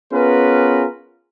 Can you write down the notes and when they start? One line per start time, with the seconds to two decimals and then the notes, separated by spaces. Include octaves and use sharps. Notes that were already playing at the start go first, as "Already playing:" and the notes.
0.12 B3 C#4 F4 G#4 A#4 B4